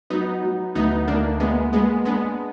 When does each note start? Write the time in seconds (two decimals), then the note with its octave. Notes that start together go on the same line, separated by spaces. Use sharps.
0.10 F#3 B3 D#4
0.43 F#3
0.75 D2 B3 D#4
1.08 D2 A#3 D4
1.40 G#3 A#3 B3
1.73 G#3 A#3 B3
2.05 G#3 B3 D4